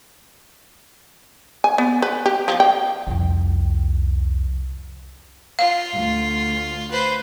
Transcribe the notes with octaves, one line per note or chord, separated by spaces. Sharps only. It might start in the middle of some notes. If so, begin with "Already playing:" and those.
G#5
B3
B4
G4
F3
G5
C2 F2
F4 F5
D2
B4 C5